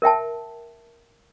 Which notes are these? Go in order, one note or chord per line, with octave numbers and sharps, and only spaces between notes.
A#4 E5 G5 A5